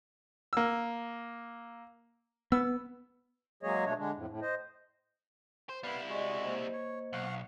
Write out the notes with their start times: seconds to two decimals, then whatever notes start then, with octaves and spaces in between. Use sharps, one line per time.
0.53 A#3 E6
2.52 B3 E6
3.63 F#3 G#3 A#3 G#4 C#5 D#5
3.85 B2 A3 D4 C#5
3.98 D3 G#3 D4
4.15 F2 A2
4.29 A2
4.42 C5 D#5
5.69 C5
5.83 G3 B3 E4 B4 F5
6.09 G#3 F#4 G4 D5 D#5
6.44 A#3 C5 D#5
6.73 C#5
7.13 B1 F5 F#5 C#6